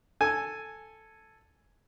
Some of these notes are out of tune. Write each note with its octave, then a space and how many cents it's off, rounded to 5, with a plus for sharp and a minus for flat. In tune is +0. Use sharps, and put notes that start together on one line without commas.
A4 +0 G#5 +0